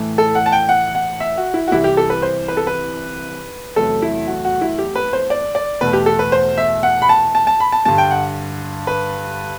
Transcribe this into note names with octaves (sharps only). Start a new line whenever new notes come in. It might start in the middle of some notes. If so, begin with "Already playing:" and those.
Already playing: A2 E3 A3
A4
F#5
A5
G5
F#5
F#5
E5
F#4
E4
F#4
C2 C3 E3 G3 E4
G4
A4
B4
C5
B4
A4
B4
E2 C3 F#3 A3 A4
E4
F#4
F#4
E4
G4
B4
C5
D5
D5
E2 B2 A3 B4
G4
A4
B4
C5
E5
F#5
B5
A5
A5
A5
B5
A5
G2 D3 G3 A5
G5
F#5
B4